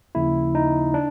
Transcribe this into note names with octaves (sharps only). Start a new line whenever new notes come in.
D#2 C#3 F3 A#3 E4
D#4
D4